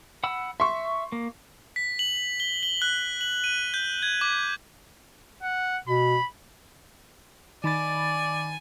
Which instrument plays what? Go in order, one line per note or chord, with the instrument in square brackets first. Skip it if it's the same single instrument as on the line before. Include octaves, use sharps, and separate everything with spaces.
[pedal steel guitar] F#5 B5 E6
[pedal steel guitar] E5 [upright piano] C6 C#6
[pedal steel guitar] A#3
[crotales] B6
F#7
G7
G7
F#6
F#7
D#7
G6
G#6
D6
[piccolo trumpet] F#5
[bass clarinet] B2 [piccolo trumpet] B5
[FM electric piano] D#3 B5 A6 [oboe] D5 [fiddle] G#5